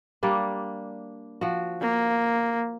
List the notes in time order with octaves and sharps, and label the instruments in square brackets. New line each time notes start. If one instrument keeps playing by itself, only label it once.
[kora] G3 A#3 D4
F3 F#4
[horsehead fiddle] A#3